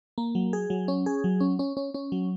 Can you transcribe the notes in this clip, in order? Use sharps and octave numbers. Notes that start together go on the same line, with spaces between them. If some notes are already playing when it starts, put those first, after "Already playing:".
A#3
F#3
G#4
F#3
C#4
G#4
F#3
C#4
C#4
C#4
C#4
F#3